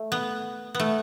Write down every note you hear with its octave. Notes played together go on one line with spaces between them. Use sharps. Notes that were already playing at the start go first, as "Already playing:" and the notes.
Already playing: A3
B3
B3
A3